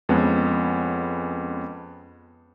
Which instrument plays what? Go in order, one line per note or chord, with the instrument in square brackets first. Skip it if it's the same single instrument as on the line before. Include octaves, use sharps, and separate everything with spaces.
[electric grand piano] F2 G#3 B3 C#4 F#5